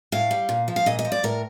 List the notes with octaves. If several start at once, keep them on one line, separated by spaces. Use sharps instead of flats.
A2 F5
G3
A#2
F3
F5
A#2 D#5
D#5
F3
D5
A2 A#4